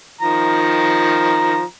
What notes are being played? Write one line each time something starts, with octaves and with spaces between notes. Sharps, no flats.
D#3 F3 A#5